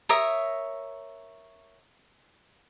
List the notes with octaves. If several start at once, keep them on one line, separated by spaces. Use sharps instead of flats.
A#4 C#5 E5 D#6